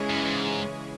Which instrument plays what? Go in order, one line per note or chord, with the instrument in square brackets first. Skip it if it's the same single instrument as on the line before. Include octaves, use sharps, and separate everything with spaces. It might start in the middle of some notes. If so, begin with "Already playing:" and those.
Already playing: [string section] C#3 E3 G#3 C#4 G#4
[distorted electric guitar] F#2
G#2